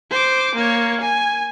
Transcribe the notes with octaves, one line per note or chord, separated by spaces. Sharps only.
C5 D6
A#3 C#5
G#5